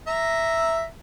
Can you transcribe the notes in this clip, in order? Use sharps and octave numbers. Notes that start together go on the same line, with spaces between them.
E5 A#5